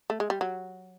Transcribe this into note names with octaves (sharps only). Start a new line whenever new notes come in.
A3
G#3
G3
F#3